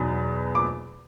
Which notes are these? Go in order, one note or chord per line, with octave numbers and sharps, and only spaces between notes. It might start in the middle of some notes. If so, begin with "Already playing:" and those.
Already playing: E2 B2 F#3 B3 D#4
D6